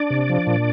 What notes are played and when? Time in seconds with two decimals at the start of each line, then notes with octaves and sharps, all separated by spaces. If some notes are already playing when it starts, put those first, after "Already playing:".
Already playing: D4 D5
0.10 C3
0.29 F3
0.47 A#2